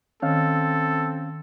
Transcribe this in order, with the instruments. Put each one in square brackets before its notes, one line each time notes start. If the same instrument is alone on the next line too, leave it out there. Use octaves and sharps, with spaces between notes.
[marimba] D#3 [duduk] C4 [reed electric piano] C#4 F5 [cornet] A4